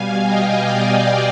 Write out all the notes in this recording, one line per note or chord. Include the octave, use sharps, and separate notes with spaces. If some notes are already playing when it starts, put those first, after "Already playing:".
Already playing: B2 G3 F5 G#5
D#5 G5
D5 F5
D5